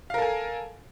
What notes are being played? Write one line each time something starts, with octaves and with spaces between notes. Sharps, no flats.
A4 A#4 F5 G#5